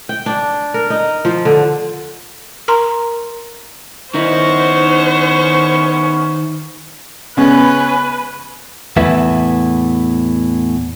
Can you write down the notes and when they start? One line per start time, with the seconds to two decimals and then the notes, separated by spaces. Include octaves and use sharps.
0.09 G5
0.26 D4
0.74 A#4
0.90 D#4
1.25 F3
1.45 D3
2.68 A#4 A#5 C6
4.14 D#3 B3 C#4 D#4 E4 C5 C#6
7.37 C#3 G#3 B3 C#4 B4
8.97 E2 A2 E4 B4 E5